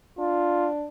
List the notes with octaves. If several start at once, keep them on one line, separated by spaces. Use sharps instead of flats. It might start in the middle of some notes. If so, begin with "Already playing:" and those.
D4 F4